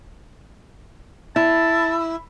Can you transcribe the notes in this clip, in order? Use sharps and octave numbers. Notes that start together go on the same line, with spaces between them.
E4 A5